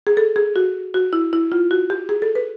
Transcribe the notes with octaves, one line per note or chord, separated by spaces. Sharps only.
G#4
A4
G#4
F#4
F#4
E4
E4
F4
F#4
G4
G#4
A4
B4